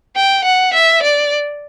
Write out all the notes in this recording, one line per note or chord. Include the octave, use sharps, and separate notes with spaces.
G5
F#5
E5
D5